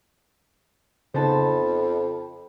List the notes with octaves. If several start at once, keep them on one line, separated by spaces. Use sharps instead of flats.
F2 C#3 B3 D#4 C5 A5 B5